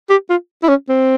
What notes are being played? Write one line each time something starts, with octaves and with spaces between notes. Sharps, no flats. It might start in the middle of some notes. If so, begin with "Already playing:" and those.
G4
F4
E4
C#4
C4